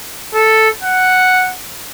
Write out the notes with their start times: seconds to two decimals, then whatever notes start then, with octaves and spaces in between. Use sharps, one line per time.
0.34 A4
0.83 F#5